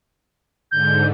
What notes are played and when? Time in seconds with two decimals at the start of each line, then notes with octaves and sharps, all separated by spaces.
0.71 G#2 D3 G6